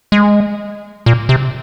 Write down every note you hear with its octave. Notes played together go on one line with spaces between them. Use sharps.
G#3
A#2
C3